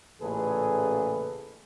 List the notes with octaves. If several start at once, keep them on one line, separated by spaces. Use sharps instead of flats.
A1 A#2 C#3 G#4 A4 B4